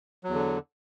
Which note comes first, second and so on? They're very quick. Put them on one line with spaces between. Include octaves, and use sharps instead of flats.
F#3 E2 D3